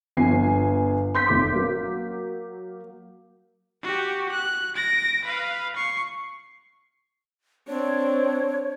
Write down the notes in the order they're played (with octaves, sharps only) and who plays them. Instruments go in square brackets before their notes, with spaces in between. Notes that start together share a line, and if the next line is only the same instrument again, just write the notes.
[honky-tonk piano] G1 F3 B3 G#5 C7
C6 G6 B6
F1 D6
F#3 A#3
[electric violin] F#4 G4
F#6
A#6 D7
B4 F5
C#6 C7
[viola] C4 D4 [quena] C#5